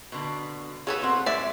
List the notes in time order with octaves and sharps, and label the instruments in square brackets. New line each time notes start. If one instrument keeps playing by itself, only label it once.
[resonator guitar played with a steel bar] B2 D3 D5
[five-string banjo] F#3 A4 B4 [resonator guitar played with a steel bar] G#4
[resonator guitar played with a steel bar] B2 C4 F#5
[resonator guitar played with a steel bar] G#3 [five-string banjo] D5 E5